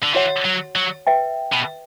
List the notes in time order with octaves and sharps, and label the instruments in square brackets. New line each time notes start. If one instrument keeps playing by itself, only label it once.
[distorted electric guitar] D3
[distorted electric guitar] E3 [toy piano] F#4 C#5 F#5
[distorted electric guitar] F#3
F#3
[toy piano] B4 E5 G5
[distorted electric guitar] B2